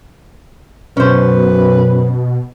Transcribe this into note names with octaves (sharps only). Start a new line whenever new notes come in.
F#2 B2 C#4 B4 C5